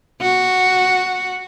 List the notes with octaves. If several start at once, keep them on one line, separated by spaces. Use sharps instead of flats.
F#4